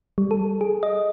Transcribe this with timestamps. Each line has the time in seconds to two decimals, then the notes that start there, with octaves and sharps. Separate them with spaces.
0.18 G3
0.31 A4
0.61 G#4
0.83 D#5